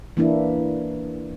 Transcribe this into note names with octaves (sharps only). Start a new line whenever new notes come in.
E3 A#3 D4 E4